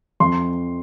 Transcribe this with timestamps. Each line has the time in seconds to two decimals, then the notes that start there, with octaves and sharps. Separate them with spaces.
0.20 F2 C6